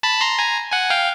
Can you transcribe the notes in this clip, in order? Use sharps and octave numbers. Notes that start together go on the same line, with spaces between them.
A5 B5
A#5 C6
G#5 A#5
F#5 G#5
F5 G5